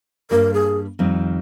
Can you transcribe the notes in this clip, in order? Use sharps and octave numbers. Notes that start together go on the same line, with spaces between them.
G2 G3 A#3 A#4
G#4
F2 D#3 G3 C4